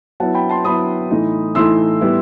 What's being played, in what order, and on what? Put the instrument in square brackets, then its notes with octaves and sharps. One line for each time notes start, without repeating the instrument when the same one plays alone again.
[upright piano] F#3 B3 E4 F#5 A5
G5 B5
A5 C6
F#3 B3 E4 B5 D#6
A2 E3 A3 D#4
A2 E3 A3 D#4 C6 E6
A2 G3 B3 E4